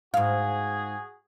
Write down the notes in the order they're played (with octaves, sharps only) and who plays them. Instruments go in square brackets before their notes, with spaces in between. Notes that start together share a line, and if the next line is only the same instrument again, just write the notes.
[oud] G#2 F5 [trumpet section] F#4 G#4